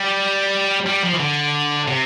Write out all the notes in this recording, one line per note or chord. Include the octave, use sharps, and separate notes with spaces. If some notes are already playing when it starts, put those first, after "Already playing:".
Already playing: G3
G3
F3
E3
D3
C3